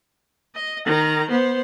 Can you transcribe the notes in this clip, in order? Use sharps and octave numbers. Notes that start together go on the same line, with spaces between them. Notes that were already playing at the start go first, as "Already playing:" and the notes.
D#5
D#3 A#5
B3 C5